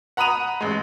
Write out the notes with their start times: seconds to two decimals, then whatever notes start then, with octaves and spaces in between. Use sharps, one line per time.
0.17 F#5 A#5 B5 D#6 D#7 F7
0.61 A1 G#3